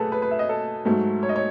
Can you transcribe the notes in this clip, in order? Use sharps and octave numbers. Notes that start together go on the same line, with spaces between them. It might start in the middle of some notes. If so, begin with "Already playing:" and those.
Already playing: B2 F#3 A3 G#4 A4 B4
B4
B4
E5
D#5
A4
G#2 F#3 A3
C#5
D#5
C#5